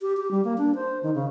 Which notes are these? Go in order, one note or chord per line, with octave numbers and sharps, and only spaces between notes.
G4
G4
G3
A#3
D4
C5
D#3
C#3